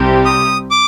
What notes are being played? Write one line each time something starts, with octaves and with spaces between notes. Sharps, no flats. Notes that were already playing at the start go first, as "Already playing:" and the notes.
Already playing: C2 C3 G3 C4 G4
D#6
D6